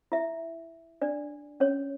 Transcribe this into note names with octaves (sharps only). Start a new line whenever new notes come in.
E4 E5
D4 D5
C#4 C#5